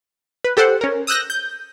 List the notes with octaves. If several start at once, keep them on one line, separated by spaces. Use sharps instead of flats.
B4
G4 A4 C5 F#5
C#4 A#4
D#6 E6 F#6 G6 A#6
G6